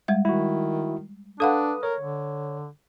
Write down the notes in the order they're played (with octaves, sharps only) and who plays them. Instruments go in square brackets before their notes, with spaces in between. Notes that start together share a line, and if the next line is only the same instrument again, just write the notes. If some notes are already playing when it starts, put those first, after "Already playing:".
[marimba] G3 G#3 E5
[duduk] D#3 [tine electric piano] E4 F#4
[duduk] D4 [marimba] A4 F5 F#5 [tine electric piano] B4 D#6
[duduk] A#4 [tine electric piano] C#5
[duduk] D3